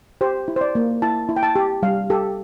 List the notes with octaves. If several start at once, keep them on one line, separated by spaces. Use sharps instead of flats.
G4 C5
E4
C5
D5
A#3
E4 A5
E4
G5
A5
G4
G3 F5
G4 A4